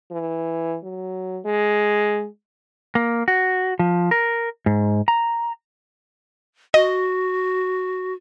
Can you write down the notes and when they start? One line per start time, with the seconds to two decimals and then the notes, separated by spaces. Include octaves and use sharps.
0.11 E3
0.83 F#3
1.45 G#3
2.95 A#3
3.28 F#4
3.79 F3
4.11 A#4
4.66 G#2
5.08 A#5
6.74 F#4 D#5